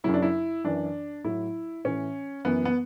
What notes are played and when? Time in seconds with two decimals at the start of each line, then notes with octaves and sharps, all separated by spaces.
0.04 F#2 C#3 F#3 E4
0.14 D4
0.22 E4
0.64 F#2 E3 D4
1.24 A2 F#3 E4
1.84 A2 E3 C#4
2.45 F#2 E3 B3
2.65 B3